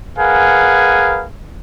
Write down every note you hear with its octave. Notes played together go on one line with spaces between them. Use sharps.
G#4 A#4 B4 F5 F#5 G#5